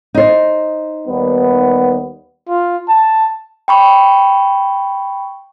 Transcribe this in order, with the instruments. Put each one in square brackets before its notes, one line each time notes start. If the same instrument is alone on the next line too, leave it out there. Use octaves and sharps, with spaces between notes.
[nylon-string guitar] D#4 C5
[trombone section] D#2 G3 B3
[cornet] F4
A5
[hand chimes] G5 B5 C#6